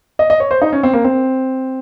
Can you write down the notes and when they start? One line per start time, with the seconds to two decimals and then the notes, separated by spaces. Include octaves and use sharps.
0.19 D#5
0.30 D#5
0.40 C#5
0.51 C5
0.62 D#4
0.72 C#4
0.83 C4
0.93 A#3
1.04 C4